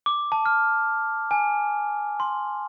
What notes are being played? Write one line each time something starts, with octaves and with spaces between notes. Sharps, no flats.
D6
A5
F6
G#5
C6